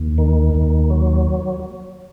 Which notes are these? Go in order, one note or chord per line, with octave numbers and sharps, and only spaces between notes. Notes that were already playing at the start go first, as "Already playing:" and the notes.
Already playing: D#2
D#3
D#2
F#3